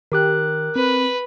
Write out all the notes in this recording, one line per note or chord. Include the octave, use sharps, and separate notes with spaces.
D#3 G4 A#4 G5 D6 F#6
C4 B4